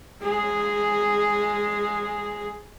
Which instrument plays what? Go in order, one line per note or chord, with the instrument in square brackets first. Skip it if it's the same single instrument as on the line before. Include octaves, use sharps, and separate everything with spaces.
[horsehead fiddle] G#3 G#4